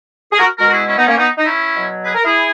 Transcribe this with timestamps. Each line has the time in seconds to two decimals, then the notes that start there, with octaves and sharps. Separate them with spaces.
0.32 G#4
0.38 F#4 A#4
0.58 B2 G#3 F#4 A#4
0.69 F#4
0.73 E4 G#4
0.88 C#4 E4
0.98 B3 D#4
1.07 A#3 C#4
1.17 B3 D#4
1.38 D#4
1.46 C#4 E4
1.76 B2 F#3
2.05 G#4 B4
2.15 A#4
2.25 E4 G#4